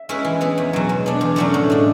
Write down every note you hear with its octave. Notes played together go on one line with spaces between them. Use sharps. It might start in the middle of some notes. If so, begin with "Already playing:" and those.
Already playing: E5
G#3 C#4 E4 B4
E3
B3 E4 G#4
E2
B2 F#3
G#3
B3 D4
E2
D3 F#3 A3 C#4
A2
G#3 D4